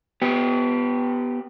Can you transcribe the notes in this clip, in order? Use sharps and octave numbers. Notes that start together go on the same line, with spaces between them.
B3 G4